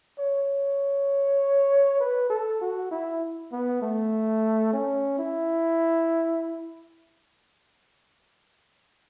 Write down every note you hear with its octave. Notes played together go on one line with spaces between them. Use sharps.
C#5
B4
A4
F#4
E4
B3
A3
C#4
E4